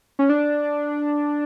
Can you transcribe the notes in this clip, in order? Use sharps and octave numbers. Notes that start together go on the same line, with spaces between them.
C#4
D4